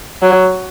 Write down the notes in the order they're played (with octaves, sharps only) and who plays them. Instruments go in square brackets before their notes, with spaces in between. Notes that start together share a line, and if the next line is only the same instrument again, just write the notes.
[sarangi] F#3